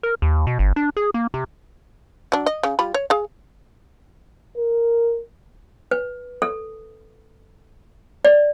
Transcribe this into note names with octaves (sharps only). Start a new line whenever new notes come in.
A#4
D#2
B2
G1
D4
G#4
A#3
C3
F#3 D4
D#5
C#3
G3 F4 B5
C#5
G#4 F5
A#4
B4
A4
D5